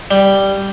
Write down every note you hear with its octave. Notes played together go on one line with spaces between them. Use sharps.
G3